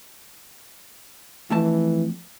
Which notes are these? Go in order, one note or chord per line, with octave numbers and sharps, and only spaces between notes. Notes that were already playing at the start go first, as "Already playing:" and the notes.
F2 E3 A3 A5